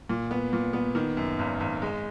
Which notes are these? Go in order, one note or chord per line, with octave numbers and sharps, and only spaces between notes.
A#2
B3
A#2
B3
D#3
F#2
G#1
G#1
G#3